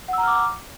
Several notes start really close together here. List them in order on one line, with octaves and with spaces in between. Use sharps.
F#5 E6 A#5 F6 D6